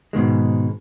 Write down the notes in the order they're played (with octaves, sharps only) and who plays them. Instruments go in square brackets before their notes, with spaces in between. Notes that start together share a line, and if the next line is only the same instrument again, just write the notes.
[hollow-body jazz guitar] G#2 B2 D#3 G#3